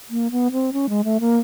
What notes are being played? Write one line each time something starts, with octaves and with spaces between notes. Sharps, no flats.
A#3
B3
C4
C#4
G#3
A3
A#3